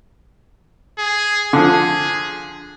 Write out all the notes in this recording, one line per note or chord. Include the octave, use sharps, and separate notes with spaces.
G#4
D3 F3 G#4